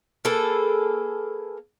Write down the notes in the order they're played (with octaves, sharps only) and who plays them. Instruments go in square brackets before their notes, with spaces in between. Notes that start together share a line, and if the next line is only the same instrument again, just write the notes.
[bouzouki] A#3 G#4 A4 B4